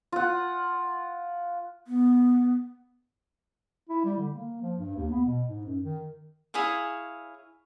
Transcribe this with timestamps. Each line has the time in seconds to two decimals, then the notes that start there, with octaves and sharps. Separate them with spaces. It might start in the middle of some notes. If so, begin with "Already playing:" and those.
0.12 F4 F#5
1.87 B3
3.89 E4
4.05 G3
4.17 D3
4.34 A#3
4.62 F3
4.77 G2
4.96 D#2
5.11 B3
5.25 B2
5.48 G#2
5.66 F#2
5.83 D#3
6.54 E4 G#4 C#5 F5